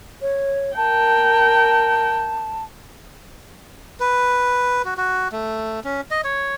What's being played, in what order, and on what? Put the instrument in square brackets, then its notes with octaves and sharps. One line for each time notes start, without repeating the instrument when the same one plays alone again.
[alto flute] C#5
[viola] A#4 G5 [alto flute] A5
[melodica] B4
F#4
F#4
A3
C#4
D#5
C#5